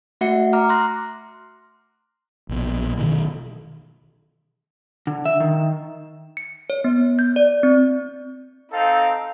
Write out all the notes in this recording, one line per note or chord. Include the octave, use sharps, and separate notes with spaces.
A3 F#4 E5 F#5 C#7
A#5 D6 F6
C6 F6 F#6 A#6
A#1 B2
B2 D#3 E3
D3
E5
D#3
C#7
C#5
B3
G6
D5
C4
C4 D#4 A4 F5